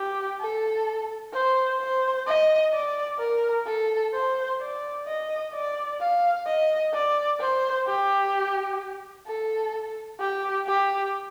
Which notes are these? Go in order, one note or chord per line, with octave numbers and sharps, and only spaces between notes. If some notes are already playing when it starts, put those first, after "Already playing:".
Already playing: G4
A4
C5
C5
D#5
D5
A#4
A4
C5
D5
D#5
D5
F5
D#5
D5
C5
G4
A4
G4
G4